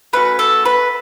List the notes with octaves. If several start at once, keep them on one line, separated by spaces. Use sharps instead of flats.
A3 C#4 F#4 B4
A4
B4